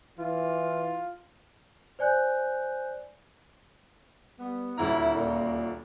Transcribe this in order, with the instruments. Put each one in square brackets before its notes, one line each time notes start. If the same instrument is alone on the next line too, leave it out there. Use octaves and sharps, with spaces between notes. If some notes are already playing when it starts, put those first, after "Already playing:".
[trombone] E3 [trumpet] F4
[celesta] C5 D5 G#5 F#6 G6
[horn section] G3 B3
[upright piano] D#1 D2 A#5 [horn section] E4
[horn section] A#2